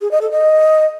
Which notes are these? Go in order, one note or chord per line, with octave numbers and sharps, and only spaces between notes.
G#4
D#5
A4
D#5